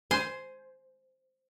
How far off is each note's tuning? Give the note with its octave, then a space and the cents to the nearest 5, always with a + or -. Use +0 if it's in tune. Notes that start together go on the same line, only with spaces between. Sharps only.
C5 -5 G#5 +15